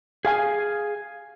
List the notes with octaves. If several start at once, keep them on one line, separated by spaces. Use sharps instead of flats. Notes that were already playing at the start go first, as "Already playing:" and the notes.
G#4 F5 G#5